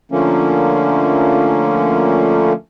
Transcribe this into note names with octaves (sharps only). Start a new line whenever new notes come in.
D3 F3 A3 A#3 C#4